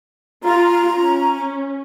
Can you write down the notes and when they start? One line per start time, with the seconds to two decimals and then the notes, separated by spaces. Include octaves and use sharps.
0.44 F4 A#5
0.98 C#4